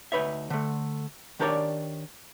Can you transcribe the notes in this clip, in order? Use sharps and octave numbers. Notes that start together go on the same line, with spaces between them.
D2 D#4 B4 C#5 E5
D3 A3
D#3 D4 G4 A#4 C#5 D5